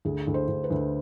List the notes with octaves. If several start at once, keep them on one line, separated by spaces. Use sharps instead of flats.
D2 G#4
D2
C5
D2
B4
D2